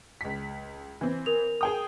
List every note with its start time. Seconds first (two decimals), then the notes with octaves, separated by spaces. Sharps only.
0.21 C#2 B6
1.01 E3 C4
1.26 A#4 F7
1.61 G#4 G5 D#6